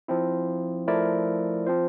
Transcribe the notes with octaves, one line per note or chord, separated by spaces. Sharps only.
F3 C4 E4
F3 A3 E4 A#4 D5
F3 C4 F4 C5